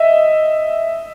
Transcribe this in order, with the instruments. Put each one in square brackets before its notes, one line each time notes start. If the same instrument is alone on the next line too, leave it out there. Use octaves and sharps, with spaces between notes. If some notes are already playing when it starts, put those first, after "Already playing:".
Already playing: [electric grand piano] D#5 E5